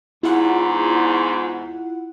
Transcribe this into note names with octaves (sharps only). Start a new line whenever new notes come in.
E2 G#2 E4 F4 F#5